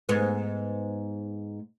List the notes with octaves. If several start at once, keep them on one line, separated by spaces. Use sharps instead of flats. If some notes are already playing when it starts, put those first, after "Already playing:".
G#2 B3